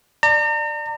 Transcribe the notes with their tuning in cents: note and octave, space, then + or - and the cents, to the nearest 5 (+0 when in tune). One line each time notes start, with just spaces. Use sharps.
D5 +15 A#5 -40